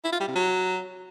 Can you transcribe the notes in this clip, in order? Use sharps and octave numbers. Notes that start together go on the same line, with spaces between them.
E4
F4
G3
C3
F#3